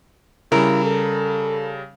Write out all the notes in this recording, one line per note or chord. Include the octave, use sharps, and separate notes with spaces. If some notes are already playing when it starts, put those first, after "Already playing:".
C#3 G3 E4 A#4
A4